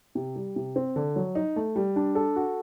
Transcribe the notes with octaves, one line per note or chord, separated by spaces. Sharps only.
C3
G3
C3
C4
D3
F#3
D#4
A3
G3
D4
A4
F#4